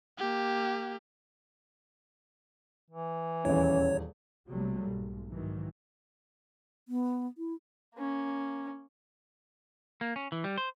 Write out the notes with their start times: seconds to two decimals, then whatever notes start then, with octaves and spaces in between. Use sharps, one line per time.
0.18 A#3 G4
2.91 E3
3.45 D#1 E2 C#4 C#5
4.50 B1 C3 F#3 G3 A3 A#3
4.83 B1 G#2
5.30 G#2 D#3 E3 F#3
6.88 B3
7.38 E4
7.96 A#3 C#4
10.01 A#3
10.16 C#4
10.32 E3
10.44 G3
10.58 C5